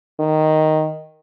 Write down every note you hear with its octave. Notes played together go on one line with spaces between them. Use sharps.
D#3